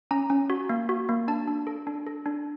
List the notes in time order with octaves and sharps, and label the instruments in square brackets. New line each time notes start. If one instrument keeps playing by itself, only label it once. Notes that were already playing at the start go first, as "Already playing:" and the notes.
[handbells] C#4 A#5
C#4
F#4
A#3
F#4
A#3
D4 A5
D4
A4
D4
A4
D4